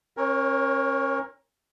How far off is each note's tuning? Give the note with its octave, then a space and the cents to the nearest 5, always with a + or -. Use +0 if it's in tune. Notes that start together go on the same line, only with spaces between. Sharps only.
C#4 -40 A#4 +15 C#5 +0